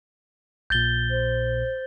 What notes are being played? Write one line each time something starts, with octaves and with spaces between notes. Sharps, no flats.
A#1 A#2 G6 A6 G7
C5